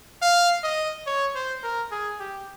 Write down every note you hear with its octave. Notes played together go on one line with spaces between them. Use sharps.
F5
D#5
C#5
C5
A#4
G#4
G4